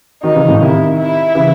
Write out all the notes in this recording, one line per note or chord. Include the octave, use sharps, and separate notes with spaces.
D#3 F#3 D#4
C#3 E3
A2 C#3
C3 D#3 E4
E4
C#3 E3